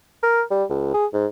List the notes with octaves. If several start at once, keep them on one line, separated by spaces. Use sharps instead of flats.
A#4
G3
C#2
G#4
G#2